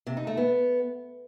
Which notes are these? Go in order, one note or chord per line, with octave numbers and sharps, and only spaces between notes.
C3
D#4
A3
B3